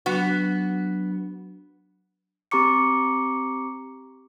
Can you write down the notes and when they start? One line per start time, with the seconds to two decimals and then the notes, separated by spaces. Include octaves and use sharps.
0.06 F#3 B3 D4 F#4
2.51 C4 G4 A#5 C#6 D6 C#7